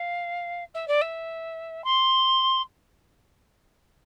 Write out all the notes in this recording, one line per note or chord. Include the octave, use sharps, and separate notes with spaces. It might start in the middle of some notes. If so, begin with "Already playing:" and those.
Already playing: F5
E5
D5
E5
C6